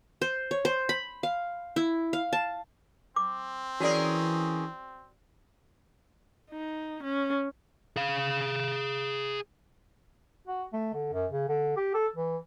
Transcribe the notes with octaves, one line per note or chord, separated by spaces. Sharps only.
C5
C#5
C5
B5
F5
E4
F5
A5
C4 D6
E3 C#4 F#4 G#4 A#4 D5
D#4
C#4
G#4 F5
F#4
A3
D3
F#2
C#3
D3
G4
A4
E3